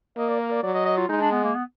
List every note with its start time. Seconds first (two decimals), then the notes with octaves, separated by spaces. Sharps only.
0.17 A#3 D#5
0.28 D5
0.40 A#4
0.51 D5
0.63 F#3 D5
0.74 D#5
0.85 D#5
0.97 F4
1.09 G#3 D#4
1.21 D4
1.31 B3
1.44 A#3
1.55 B3